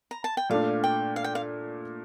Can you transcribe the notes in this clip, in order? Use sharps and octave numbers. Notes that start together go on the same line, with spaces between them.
A#5
A5
G5
A#2 A3 D4 F5
G5
F5
G5
F5